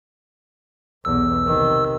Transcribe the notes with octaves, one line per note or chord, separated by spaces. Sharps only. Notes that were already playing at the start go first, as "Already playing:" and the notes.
B1 E2 E6
C3 D#3